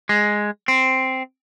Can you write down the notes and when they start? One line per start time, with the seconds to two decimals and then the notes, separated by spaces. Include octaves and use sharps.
0.09 G#3
0.68 C4